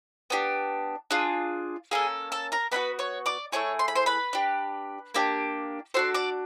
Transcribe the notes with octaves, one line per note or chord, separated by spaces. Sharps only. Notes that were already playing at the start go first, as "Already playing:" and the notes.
B3 D4 G4
D4 F4 G#4
A#3 C#4 G#4 A4 G#5
A4 A5
A#4 A#5
B3 D4 F#4 B4 B5
C#5 C#6
D5 D6
A3 C4 E4 G#4 C#5 C#6
C6
B5
C5 C6
B4 B5
D4 G4
A#3 D4 G4
D4 F#4 A4 C5 C6
D5 D6